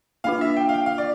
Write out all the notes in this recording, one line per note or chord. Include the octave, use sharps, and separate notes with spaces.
A#3 D4 F4 F5
E5
G5
F5
G5
F5
D5